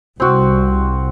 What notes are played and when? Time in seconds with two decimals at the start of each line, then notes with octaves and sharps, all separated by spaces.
0.20 C2 C4 F#4